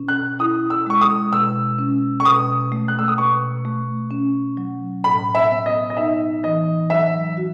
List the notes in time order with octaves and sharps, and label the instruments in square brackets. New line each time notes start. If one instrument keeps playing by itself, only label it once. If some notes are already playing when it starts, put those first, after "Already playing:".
Already playing: [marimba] B2 C#4
[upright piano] F#6
[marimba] E4 [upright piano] D#6
[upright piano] E6
[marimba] G#3 [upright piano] C#6
[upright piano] D#6
[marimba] B2 [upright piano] E6
[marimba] C#4
[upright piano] C#6
[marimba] B2 [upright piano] D#6
[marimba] A3
[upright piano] F#6
E6
D#6
[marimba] B2 [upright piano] C#6
[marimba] A3
C#4
F#3
[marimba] A2 [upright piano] B5
[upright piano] E5
[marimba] B3
[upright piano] D#5
D#5
[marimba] D#4 [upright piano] E5
[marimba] E3 [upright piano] D#5
[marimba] F#3 [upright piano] E5
[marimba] F#4